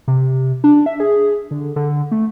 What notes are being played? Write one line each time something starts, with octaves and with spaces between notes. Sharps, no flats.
C3
D4
E5
G#4
D3
D3
A3